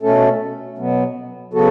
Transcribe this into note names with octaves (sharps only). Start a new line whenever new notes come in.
B2 A3 C#4 A4
B2 F#3 B3
C#3 F#3 B3 F#4 A4